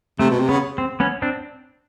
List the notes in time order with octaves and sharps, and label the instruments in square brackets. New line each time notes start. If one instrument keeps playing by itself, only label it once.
[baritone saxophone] C3 [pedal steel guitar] A3
[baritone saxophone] B2
C3
[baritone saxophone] C#3 [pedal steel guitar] B3
[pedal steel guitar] C4
B3 C#4
C4 D4